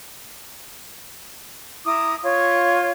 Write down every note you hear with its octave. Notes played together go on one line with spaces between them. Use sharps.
E4 A#5 D6 D#6
F4 C#5